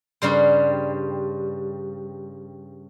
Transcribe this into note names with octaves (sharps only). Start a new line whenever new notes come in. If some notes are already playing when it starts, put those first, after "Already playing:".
G2 C#3 G3 C5